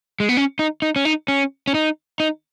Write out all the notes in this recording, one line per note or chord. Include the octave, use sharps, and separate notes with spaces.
G#3
B3
C#4
D#4
D#4
C#4
D#4
C#4
C#4
D#4
D#4